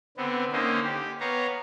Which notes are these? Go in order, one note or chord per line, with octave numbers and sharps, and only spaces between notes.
D3 B3 C4
D3 A#3 C#4 D#4 C5
G4
B3 C#5 F5 A#5